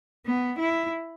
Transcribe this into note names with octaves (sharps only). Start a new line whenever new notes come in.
B3
E4